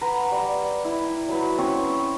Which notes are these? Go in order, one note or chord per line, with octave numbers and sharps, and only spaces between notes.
B4 F#5 A#5 C6
G3 D6
E4
F#3 B4
C4 C#4 C#5